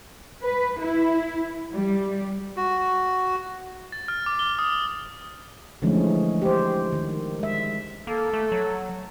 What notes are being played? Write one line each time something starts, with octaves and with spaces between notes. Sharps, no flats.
B4
E4
G3
F#4
A6
F6
D6
G7
D#6
D3 E3 F3 G#3 A3 C#4
G4 C5
D#3
G#3 E5
A#3 A4
A3
F#3